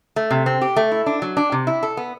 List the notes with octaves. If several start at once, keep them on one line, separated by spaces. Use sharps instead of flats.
A3
C3
C4
G4
A3
E4
D4
F#3
D4
C3
E4
A4
B3